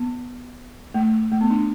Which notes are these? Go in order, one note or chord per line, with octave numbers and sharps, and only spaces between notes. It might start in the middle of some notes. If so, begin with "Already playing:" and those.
Already playing: B3
A3
A3
B3
D4